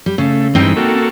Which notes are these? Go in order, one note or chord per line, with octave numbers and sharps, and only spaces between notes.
G3
C#3 A3
G2 E3 G#3 C4 D#4 G5
A#3 F#4 A4